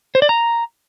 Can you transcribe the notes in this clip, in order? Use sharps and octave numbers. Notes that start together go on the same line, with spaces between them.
C5
D5
A#5